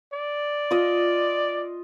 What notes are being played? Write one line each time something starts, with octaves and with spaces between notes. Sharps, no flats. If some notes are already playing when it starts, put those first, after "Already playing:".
D5
F4 D#5